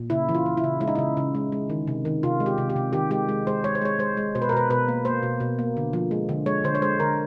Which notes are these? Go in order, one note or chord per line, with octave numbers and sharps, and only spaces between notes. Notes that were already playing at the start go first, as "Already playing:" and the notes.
Already playing: A#2
C#3 E4
E3
F4
E3
E4
C#3
G#3 E4
D#4
C#3 E4
C#3
G#3
G#3
D#3
C3
D#3
C3 F4
G#3
G4
C3
G4
C3
D#3 G4
G#3 G4
G#3
G#3 C5
G#3 C#5
C5
G#3 C#5
G#3 C5
G#3
B2 C5
B4
A#4
B2 B4
B2 B4
A#3
A#3 C5
B2
B2
A#3
D3
F3
G#3
D3
G#3 C#5
D3 C5
C#5
G#3 C5
D3 A#4